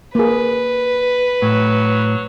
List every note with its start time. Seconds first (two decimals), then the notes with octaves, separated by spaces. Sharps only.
0.15 A#3 G#4 B4
1.42 A2 F#3